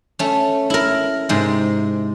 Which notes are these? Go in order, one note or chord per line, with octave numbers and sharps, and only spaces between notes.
A3 C#4
E4 A#4
G#2 C3 G#3